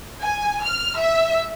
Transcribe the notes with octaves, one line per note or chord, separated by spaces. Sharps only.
G#5
F6
E5